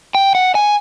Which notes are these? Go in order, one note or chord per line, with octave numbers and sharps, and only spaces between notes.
G5
F#5
G#5